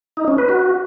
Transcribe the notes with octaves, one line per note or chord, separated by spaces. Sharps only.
D#4
C#4
B4
F#4